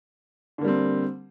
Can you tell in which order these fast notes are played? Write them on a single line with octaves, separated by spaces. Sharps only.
D3 A#3 G3 C4